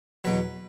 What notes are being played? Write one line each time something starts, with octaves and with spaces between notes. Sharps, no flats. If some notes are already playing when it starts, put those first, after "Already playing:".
E2 B2 F#3 B4